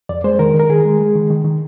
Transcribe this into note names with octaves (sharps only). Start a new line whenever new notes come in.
F2 D5
G#3 C5
D#3 A#4
D#3
A#4
D#3 G#4
G#3
G#3
D#3
D#3
D#3